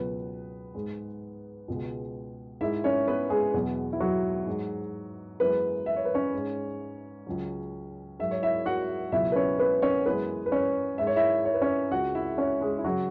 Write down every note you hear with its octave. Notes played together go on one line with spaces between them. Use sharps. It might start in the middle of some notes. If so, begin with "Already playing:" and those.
Already playing: C#2 B2 F#3 B3 B4
G#2 G#3
C#2 B2 G#3
G#2 G#3 E4 E5
C#4 C#5
B3 B4
G#3 G#4
E2 B2 F#3
E4
F#3 F#4
G#2 G#3
F#2 E3 G#3 B3 B4
E5
C#5
B4
C#4 C#5
G#2 G#3
C#2 C#3 F#3
G#2 F#3 E5
C#5
E4 E5
F#4 F#5
C#2 B2 F#3 E4 E5
B4
C#4 C#5
B3 B4
C#4 C#5
F#2 E3 G#3 B3 B4
B4
C#4 C#5
G#2 G#3 E5
C#5
E4 E5
C#5
B4
C#4 C#5
C#2 C#3 G#3 F#4 F#5
E4 E5
C#4 C#5
G#3 G#4
E4
C#3 F#3 F#4